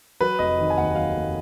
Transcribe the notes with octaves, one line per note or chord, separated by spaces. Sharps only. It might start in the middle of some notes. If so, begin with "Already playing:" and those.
F#3 B4
F1 D#5
D#3
G#5
D#2 F#5
F#3 F5
F1